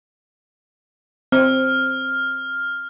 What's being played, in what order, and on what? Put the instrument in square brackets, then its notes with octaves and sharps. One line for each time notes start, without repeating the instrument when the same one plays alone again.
[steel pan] C4 [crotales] F6